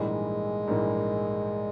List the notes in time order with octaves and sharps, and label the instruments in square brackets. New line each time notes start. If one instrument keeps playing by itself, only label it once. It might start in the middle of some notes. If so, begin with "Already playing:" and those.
Already playing: [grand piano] A#1 G#2 E3 G3 A#3 [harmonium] G#3
[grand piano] A#1 G#2 E3 G3 A#3